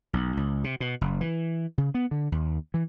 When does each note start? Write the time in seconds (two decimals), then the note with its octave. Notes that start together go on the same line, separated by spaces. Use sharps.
0.13 B1
0.37 C#2
0.64 C3
0.80 B2
1.01 F#1
1.21 E3
1.78 C#3
1.94 B3
2.11 D3
2.32 D#2
2.74 E3